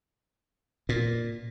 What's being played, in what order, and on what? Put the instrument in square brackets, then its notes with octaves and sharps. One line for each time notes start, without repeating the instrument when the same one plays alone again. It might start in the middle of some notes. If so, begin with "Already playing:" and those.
[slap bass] A#2